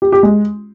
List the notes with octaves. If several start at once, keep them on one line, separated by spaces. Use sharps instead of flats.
G4
G4
G#3